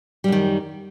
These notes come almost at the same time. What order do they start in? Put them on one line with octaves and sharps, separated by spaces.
G3 F#2 D#3